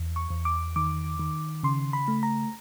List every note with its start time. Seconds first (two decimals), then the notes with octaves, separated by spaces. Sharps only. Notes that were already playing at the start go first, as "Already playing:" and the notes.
Already playing: E2
0.16 C#6
0.30 E2
0.45 D6
0.76 D#3 D6
1.19 D#3
1.63 C#3 C6
1.93 B5
2.08 A3
2.23 A#5